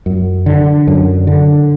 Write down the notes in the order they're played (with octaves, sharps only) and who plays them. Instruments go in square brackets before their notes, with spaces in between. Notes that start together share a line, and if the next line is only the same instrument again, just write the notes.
[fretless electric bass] F#2
D3
F#2
D3